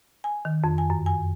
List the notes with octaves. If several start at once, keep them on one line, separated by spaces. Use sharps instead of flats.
G#5
D#3
F2
G#5
F#2
G#5